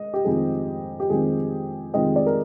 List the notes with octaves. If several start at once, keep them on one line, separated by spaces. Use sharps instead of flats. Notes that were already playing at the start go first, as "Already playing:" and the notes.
Already playing: G#3 D#5
G4
F2 D#3 G#3 C4 G#4
G4
F2 D#3 G#3 C4 G#4
F2 D#3 G#3 C4 D#5
D5
A#4